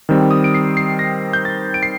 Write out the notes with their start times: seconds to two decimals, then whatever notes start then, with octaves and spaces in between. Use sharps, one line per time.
0.09 D#3 G3 C4
0.31 D#6
0.44 D7
0.54 C7
0.77 C7
0.99 A#6
1.33 G6
1.45 A6
1.74 D7
1.83 C7